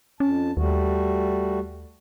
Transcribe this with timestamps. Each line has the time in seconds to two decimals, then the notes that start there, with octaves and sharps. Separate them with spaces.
0.20 F2 C#4 A5
0.57 D#2 G3 A3 F#4